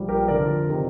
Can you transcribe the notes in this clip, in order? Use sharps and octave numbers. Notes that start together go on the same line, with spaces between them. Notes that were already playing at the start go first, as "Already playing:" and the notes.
Already playing: A#1 A#2 G3
G4 A#4
F2 D3 F3 A#4 D5
C3 D#3